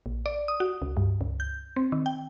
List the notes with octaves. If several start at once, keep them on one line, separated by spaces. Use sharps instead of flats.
A#1
D5
D#6
F#4
C#2
G2
C#2
G6
C4
D#3
G5